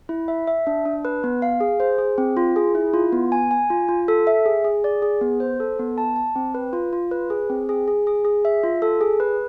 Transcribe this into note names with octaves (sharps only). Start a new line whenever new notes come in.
E4
E5
E5
D4
D4
B4
B3
F5
G#4
C5
G#4
C4
F4
G#4
E4
F4
B3
G#5
G#5
F4
F4
A4
E5
G#4
G#4
D5
G#4
B3
C5
A4
B3
A5
A5
C4
B4
F4
F4
B4
G#4
C4
G#4
G#4
G#4
G#4
E5
F4
A4
G#4
B4